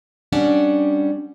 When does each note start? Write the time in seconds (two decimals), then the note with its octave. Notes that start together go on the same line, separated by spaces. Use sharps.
0.32 G3 C#4 D4 F#5